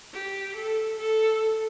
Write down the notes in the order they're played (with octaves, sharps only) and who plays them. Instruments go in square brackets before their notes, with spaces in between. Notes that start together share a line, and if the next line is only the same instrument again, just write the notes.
[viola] G4
A4
A4